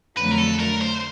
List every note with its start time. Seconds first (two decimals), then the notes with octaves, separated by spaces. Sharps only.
0.17 F2 D3 F#3 A3 B4
0.31 A#4
0.38 A4
0.60 A#4
0.81 C5